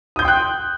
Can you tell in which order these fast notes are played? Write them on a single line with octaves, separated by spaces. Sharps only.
D#6 G6 C6 G5 F#6